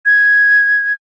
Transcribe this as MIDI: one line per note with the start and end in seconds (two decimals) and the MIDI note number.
0.06 0.93 92